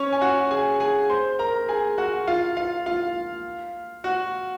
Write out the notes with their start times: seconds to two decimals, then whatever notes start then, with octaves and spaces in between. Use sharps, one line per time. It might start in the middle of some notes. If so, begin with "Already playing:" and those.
Already playing: C#4 C#5
0.13 G#5
0.21 F#4 F#5
0.51 G#4 G#5
0.80 G#4 G#5
1.10 C5 C6
1.39 A#4 A#5
1.69 G#4 G#5
1.98 F#4 F#5
2.27 F4 F5
2.57 F4 F5
2.86 F4 F5
4.04 F#4 F#5